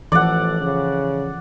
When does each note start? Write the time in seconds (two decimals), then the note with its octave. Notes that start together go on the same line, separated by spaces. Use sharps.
0.12 A1 E3 F3 A4 D5 F#5
0.60 C#3